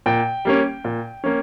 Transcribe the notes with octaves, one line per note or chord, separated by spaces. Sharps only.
A#2 G5
G3 A#3 C#4
A#2
A#3 C#4